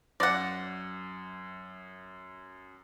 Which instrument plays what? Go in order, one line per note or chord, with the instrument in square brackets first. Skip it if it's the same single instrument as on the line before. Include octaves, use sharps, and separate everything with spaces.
[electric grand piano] F#2 A#6 [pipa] D5 F#5